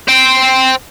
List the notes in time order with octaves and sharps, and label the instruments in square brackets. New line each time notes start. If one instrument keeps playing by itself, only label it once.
[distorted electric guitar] C5 G5